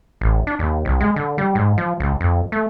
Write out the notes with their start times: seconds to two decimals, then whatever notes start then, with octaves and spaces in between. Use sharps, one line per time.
0.21 A1
0.47 D4
0.59 D#2
0.85 C2
1.00 G#3
1.16 D3
1.38 G3
1.55 G#2
1.78 F3
2.00 C#2
2.21 F2
2.52 A3